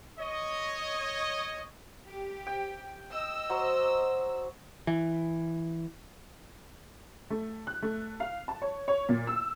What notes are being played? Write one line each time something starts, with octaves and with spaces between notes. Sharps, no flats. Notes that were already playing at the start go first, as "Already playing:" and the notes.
C#5 D#5
G4
G5
D#5 E6
F#3 C5
E3
A3
F#6
A3
F5
A5
C#5
C#5
A#2
E6